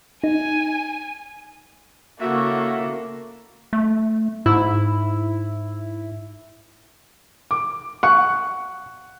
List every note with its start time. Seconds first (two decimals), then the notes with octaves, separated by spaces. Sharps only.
0.24 D#4 G#5
2.21 C#3 A#3 E4 F#4 A4 E5
3.73 A3
4.46 G#2 E4
7.51 D6
8.03 F#5 C#6